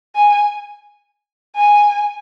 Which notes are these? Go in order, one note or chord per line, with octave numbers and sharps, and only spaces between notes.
G#5
G#5